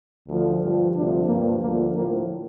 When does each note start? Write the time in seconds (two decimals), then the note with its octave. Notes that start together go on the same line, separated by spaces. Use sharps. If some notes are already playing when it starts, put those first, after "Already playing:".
0.28 D2 D3 F3
0.60 G2 F3
0.94 D2 C3 F3 D4
1.27 G2 F3 A#3
1.60 D2 D3 F3 A#3
1.94 A2 F3 A#3